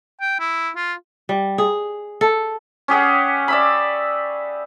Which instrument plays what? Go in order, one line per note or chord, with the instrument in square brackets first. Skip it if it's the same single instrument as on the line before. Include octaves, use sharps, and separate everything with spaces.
[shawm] G5
E4
F4
[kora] G3
G#4
A4
[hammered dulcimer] C#4 G4 G#4 F#5
D5 E5 B5